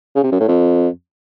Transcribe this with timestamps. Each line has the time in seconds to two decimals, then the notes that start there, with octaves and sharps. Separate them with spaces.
0.15 C#3
0.23 C3
0.32 F#2
0.40 A2
0.48 F2